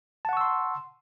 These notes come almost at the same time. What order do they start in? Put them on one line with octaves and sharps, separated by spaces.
A5 F#5 C#6 E6 C6